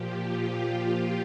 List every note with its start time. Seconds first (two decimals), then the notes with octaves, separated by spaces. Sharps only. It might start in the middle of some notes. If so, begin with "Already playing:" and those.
Already playing: A#2 F3 G4
0.21 F4